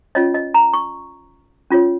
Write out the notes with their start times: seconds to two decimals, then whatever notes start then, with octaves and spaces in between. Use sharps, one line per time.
0.15 C#4 F4 C#5 D#5
0.34 D#5
0.54 A#5
0.73 C#6
1.70 C#4 F4 C#5